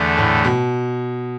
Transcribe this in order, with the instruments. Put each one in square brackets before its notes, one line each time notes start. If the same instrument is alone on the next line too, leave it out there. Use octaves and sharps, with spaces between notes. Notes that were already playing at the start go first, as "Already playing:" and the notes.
Already playing: [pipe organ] E2 D3 A3
[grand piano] A2
B2